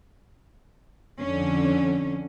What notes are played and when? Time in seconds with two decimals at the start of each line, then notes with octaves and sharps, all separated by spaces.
1.19 F2 D3 C#4